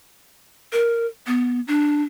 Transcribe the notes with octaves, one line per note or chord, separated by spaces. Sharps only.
A#4
B3
D4